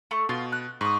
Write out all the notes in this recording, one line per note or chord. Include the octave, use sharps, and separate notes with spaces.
A3 C#6
B2 F4 C6
F#6
G#2 C#6 D#6